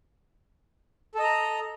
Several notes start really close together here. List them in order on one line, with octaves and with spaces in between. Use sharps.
A4 D#5 A#5